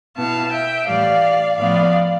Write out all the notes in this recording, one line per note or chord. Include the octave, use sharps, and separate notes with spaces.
B2 B3 E4 F5 A5
E5 G5
A2 E3 G3 D5 F5
A2 F3 B3 D5 F5